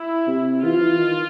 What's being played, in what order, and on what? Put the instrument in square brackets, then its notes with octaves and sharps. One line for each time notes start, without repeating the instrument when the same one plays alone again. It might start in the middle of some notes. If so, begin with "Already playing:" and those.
Already playing: [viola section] E4
[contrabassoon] C3
[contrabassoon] E3 [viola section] F4
[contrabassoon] F3
E3
D#3